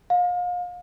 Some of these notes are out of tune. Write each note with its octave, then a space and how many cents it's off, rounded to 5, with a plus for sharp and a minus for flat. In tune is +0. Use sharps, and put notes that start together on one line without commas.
F5 +35